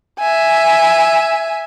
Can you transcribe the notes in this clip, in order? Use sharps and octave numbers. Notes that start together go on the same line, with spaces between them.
E5 G#5